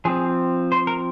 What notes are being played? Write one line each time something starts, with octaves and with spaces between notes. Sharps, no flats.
F3 C4 G#4
C5
A#4